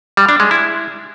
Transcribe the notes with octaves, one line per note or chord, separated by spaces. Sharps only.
G3
D4
G#3
E4